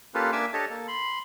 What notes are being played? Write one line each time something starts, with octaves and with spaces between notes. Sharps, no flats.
A#3 C#4 F4 G4 A4 B4
A#3 D4 E5 G#5 D6 E6
D4 G4 A4 C#5 D#5 A5
A#3 A4
B5 C6